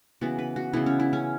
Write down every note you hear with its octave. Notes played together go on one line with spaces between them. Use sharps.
C#3 E3 B3 F#4
B4
F#4
C#3 E3 B3 E4
C#4
E4
C#4